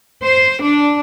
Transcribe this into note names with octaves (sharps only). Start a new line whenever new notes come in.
C5
D4